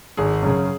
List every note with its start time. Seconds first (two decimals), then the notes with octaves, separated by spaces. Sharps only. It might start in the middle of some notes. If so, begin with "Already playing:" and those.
0.17 G#1 G#4
0.42 F#2 C#3